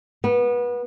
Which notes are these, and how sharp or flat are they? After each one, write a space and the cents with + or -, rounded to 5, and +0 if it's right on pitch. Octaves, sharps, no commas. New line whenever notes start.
B3 -25